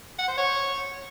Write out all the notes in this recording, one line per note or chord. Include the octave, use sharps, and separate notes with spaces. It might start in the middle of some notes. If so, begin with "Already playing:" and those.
F#5
C5
C#5